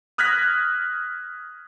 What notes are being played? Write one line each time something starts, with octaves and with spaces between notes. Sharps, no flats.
D#6 F6 F#6 G#6 A#6 B6